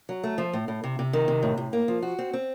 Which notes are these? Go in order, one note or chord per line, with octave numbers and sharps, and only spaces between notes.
F#3
A3
F3
A2
A2
C3
C3
D#3
C3
A2
A2
A#3
F3
F#4
C4
C4